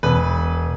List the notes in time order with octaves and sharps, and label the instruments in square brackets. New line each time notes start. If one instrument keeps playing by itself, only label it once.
[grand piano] E1 B4